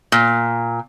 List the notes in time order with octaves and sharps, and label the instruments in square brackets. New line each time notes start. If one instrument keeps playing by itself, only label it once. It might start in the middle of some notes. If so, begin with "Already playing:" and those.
[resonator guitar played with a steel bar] A#2